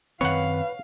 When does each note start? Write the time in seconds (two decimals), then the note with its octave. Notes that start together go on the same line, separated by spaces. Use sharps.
0.21 F#2 D#3 C4 B4 C#5 F5 F#5